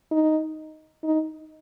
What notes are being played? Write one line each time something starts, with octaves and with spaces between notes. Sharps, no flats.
D#4
D#4